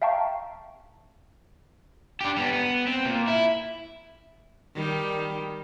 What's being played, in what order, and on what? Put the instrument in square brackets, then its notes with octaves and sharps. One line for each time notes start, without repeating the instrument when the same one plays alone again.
[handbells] E5 F5 G5 A5 A#5 C#6
[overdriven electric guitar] D4 G4
G3 B3
B3
C4
A#2
E4
[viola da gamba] D#3 G3